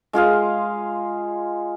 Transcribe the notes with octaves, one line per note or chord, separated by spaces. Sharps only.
G#3 F4 G#4 F5